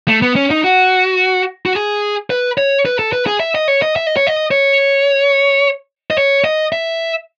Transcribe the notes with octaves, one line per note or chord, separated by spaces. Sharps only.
A3
B3
C#4
D#4
F#4
F#4
G#4
B4
C#5
B4
A4
B4
G#4
E5
D#5
C#5
D#5
E5
D#5
C#5
D#5
C#5
D#5
C#5
D#5
E5